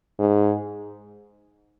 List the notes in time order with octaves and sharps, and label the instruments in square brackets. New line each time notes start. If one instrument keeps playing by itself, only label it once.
[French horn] G#2